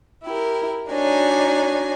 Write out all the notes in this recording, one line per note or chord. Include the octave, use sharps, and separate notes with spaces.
E4 G4 A#4
D4 D#4 F#4 C#5 G#5